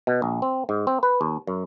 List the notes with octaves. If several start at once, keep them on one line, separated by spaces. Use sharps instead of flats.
B2
A#1
C4
G#2
C4
B4
D#2
F#2